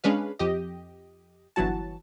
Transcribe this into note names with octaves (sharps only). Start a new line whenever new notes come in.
G#3 C#4 D4 B4 F5
F2 G4 D#5
G1 E3 F#3 F#4 A5